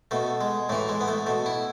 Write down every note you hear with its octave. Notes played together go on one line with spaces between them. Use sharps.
B2 A3
G#3
A2 E3 A3
G#3
B3
A3
B2 A3
E4